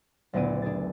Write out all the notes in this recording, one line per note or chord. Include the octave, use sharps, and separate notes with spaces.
F#1 D2 A#2 B3 D5 D#7
D4 G#4 A6